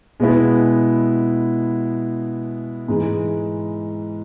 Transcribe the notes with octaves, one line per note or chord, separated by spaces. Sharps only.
B2 G#3 B3 E4
G#2 E3 G#3